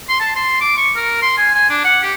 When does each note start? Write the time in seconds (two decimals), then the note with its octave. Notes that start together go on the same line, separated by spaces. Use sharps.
0.09 C6
0.20 A5
0.35 C6
0.60 D6
0.77 C#6
0.96 A#4
1.22 C6
1.37 G#5
1.55 G#5
1.69 D4
1.84 F#5
2.02 G4